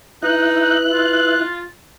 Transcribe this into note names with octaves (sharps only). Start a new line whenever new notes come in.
D#4 E4 B4 F#6
F4